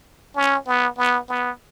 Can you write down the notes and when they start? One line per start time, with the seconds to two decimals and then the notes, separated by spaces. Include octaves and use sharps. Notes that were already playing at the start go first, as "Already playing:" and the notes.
0.36 C#4
0.67 B3
0.98 B3
1.29 B3